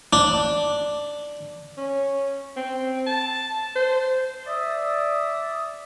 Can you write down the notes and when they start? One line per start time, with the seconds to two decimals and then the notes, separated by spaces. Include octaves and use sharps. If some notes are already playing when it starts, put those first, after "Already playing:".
0.13 D4
1.78 C#4
2.57 C4
3.07 A5
3.76 C5
4.46 D5 E5 D#6